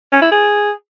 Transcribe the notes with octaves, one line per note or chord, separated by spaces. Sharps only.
C#4
E4
G#4